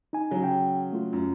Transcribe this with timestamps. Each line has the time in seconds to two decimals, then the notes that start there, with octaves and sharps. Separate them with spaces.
0.13 D#4 G#5
0.31 C#3 F#3
0.44 G5
0.93 A3 F4
1.13 F#2